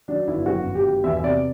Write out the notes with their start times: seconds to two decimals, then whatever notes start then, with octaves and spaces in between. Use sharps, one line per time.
0.08 F#3 D4
0.27 G1 E4
0.46 F#2 F#4
0.66 G1
0.75 G4
0.85 F#3
1.04 E2 E5
1.17 E5
1.23 C3 D5